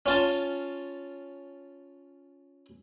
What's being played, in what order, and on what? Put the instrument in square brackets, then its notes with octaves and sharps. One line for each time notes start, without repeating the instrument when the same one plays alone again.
[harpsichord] C#4 F4 A5